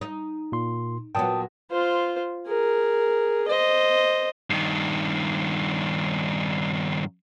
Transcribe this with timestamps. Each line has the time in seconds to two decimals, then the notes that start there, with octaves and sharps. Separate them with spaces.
0.01 D#4
0.52 A#2 C6
1.15 A#2 F#3 B3 G5 A5 D#6
1.71 F4 C5
2.47 G#4 A#4
3.48 C5 D#5
4.50 G2 D#3